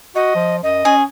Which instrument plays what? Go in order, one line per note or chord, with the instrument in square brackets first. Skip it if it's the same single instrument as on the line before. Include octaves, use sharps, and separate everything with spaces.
[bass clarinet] F#4 [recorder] D#5
[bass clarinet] F3
[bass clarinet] F#2 [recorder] D#5
[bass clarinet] C#4 [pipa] G#4